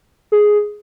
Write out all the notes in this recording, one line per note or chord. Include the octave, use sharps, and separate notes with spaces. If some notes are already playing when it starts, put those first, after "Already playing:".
G#4